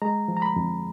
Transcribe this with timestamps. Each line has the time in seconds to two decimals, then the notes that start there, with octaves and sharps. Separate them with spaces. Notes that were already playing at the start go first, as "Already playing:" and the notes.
0.02 G#3 A#5
0.28 F3
0.37 A#5
0.42 B5
0.56 F2